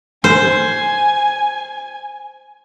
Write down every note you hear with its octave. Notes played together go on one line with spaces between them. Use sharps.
C5 G#5